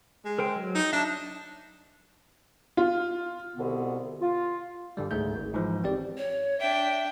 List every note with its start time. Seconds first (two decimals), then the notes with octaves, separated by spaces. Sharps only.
0.25 G#3
0.39 A#4 C5 G5
0.56 F#3
0.75 D#4
0.93 D4 E5 A5
2.77 F4
3.56 C2 B2 D3 B3
4.21 F4
4.97 G2 D3 G3
5.11 C#2 G#2 A3 G#4 G6
5.36 G#1
5.54 G#2 E3 F3
5.83 G#1 C4 G4 D5
6.17 C#5
6.60 D4 E5 G5